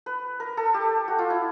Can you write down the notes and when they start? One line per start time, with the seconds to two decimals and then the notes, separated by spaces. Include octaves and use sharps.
0.06 B4
0.40 A#4
0.57 A4
0.74 G4
1.08 F#4
1.19 F4
1.30 E4